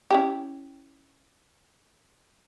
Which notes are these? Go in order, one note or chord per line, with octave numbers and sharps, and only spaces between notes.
C#4 E4 G4